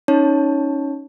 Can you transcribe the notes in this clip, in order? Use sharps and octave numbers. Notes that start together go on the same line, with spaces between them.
C#4 D#4 C#5 A5